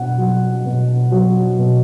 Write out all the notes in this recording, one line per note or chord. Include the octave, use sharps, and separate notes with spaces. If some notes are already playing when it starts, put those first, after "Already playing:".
Already playing: B2 F#5
F#3
B2
F#3
B2